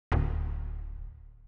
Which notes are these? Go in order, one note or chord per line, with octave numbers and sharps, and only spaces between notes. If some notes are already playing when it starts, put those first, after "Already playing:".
D1